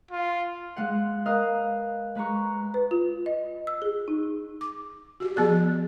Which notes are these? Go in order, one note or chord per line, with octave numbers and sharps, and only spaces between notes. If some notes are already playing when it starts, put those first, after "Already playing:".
F4
G#3 F5 F#5
A#4 B4 D#5 F5 D#6 F#6
G#3 B4 A#5 C#6
B4
F4
D#5
E6
G#4
D#4
D6
F#4 G4
F3 B3 G#4 D5